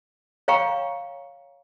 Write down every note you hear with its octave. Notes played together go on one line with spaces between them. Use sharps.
C#5 F5 G5 A#5 C#6